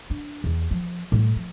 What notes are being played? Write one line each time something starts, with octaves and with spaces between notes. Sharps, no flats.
D4
E2
F3
A2 G3
F3